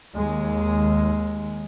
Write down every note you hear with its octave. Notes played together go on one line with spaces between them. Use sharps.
D#2 G#3